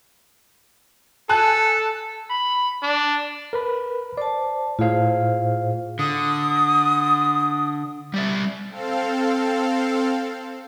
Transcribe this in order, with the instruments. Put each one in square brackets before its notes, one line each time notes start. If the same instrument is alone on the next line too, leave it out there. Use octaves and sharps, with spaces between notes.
[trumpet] A4 [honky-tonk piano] G#5 A5 F#6
[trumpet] B5
D4
[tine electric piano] A#4 B4 B5
[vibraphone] C5 A5 [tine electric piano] D5
[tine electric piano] A2 F5 [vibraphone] F4 G#4 C5
[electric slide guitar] D3 [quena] D#6
[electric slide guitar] G3 D5 E5
[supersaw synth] C4 A4 F5